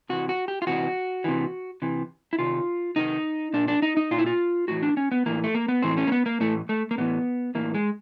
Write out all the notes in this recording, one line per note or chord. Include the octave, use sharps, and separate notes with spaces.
C3 E3 F#4
F#4
G4
F4
C3 E3 F#4
C3 E3
C3 E3
E4
C3 D#3 F4
C3 D#3 D#4
A#2 D4
D4
D#4
D#4
A#2 F4
E4
F4
A2 E3 F#4
D4
C#4
B3
A2 E3 A#3
A3
A#3
B3
A2 E3 C4
C#4
A#3
B3
A#3
A2 E3 A3
A3
A#3
A2 E3 B3
A2 E3 A#3
G#3